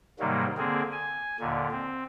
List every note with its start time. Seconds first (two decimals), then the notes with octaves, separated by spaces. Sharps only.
0.19 G#2 C3 D#3 F#3 G3 A#3
0.58 D3 A#3 C4 G#4
0.92 G#5
1.40 D#2 A#2 D3
1.71 C4